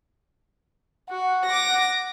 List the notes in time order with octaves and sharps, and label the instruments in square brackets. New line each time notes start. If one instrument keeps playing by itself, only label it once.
[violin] F#4 [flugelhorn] F#5
[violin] D6 A#6